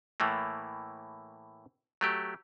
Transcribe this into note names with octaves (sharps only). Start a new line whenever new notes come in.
A2 E3 A3 A#3
F#3 A3 G4